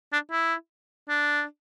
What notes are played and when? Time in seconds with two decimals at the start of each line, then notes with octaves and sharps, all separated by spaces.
0.12 D4
0.31 E4
1.09 D4